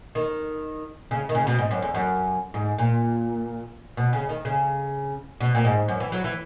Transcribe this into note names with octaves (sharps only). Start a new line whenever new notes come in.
D#3
C#3
D#3
C#3
B2
G#2
F#2
E2
F#2
G#2
A#2
B2
C#3
D#3
C#3
B2
A#2
G#2
F#2
E3
F#3
E3